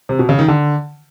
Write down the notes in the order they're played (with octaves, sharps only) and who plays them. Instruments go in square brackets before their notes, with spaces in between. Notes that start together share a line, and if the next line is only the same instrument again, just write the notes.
[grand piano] C3
B2
C#3
D#3
D3